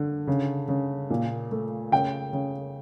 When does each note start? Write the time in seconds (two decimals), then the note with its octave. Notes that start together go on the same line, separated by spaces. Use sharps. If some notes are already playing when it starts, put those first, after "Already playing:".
Already playing: D3
0.27 C#3
0.68 C#3
1.10 A#2
1.51 A3
1.92 C#3 G5
2.33 C#3